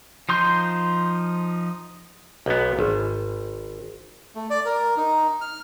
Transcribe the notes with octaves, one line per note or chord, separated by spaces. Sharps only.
F3 D#4 C6 G6
B1 B3
G#1
A3
D5
A#4
D#4
F6